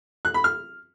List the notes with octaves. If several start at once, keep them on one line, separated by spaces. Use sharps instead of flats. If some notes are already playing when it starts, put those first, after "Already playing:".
F#6
B5
F6